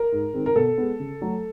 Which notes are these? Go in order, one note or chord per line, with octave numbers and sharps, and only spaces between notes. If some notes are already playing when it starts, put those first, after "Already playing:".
Already playing: A#4
G#2
D#3 G#3 C4
A#4
B2 A4
G#3 B3
C#3
F#3 A3